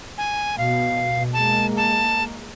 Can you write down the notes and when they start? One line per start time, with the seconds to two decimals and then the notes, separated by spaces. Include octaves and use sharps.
0.18 G#5
0.58 B2 F5
1.33 G#3 A#3 A5
1.77 A5